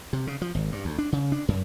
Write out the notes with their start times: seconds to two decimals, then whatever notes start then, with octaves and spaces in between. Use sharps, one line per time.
0.13 C3
0.27 C#3
0.42 F3
0.55 G#1
0.72 G2
0.85 D2
0.98 D4
1.12 C#3
1.32 D4
1.48 F#2